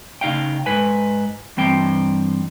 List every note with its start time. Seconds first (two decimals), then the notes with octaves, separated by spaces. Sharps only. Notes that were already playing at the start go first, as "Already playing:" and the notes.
0.21 C#3 D#4 F5 G5
0.66 G#2 B4 G#5
1.57 G2 E3 C4 G5